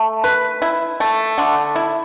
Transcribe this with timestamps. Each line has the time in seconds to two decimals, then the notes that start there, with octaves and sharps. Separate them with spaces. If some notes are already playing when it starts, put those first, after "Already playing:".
Already playing: A3
0.24 B4
0.62 E4
1.00 A3
1.38 D3
1.76 E4